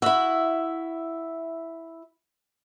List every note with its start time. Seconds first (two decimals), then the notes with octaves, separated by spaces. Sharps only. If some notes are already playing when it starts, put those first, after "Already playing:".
0.02 E4 F#4 E5